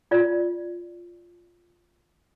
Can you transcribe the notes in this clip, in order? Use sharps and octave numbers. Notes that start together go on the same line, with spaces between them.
F4 D5